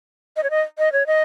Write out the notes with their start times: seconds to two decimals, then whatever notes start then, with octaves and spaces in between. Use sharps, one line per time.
0.37 D#5
0.43 C#5
0.50 D#5
0.78 D#5
0.92 C#5
1.07 D#5